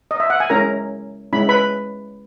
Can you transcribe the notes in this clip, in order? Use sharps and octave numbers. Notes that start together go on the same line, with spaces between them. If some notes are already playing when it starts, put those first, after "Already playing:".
D#5
E5
F#5
G#5
G#3 C#4 E4 A#4 A#5
G#3 C#4 E4 B5
B4 B5